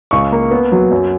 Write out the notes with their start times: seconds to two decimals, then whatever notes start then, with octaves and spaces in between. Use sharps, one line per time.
0.11 C#2 C#6
0.32 A#3
0.51 B3
0.72 F#3
0.91 F#2